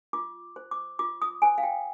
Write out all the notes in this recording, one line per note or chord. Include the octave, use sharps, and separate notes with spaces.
F4 D6
C5
D6
F4 D6
D#6
C5 G#5
F5
G5